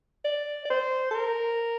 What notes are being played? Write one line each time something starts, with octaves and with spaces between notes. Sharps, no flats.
D5
D5
C5
A4
A#4